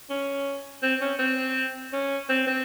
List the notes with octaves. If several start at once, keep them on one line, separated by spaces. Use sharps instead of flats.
C#4
C4
C#4
C4
C#4
C4
C4